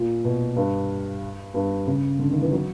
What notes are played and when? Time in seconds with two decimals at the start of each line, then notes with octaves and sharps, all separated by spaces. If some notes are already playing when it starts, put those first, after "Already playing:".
Already playing: A#2
0.24 B2
0.56 G2
1.54 G2
1.87 C#3
2.19 D3
2.31 D#3
2.42 E3
2.52 F#3